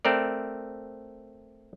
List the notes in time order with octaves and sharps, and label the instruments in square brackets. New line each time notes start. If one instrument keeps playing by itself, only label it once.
[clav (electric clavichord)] A3 C4 A#4 D5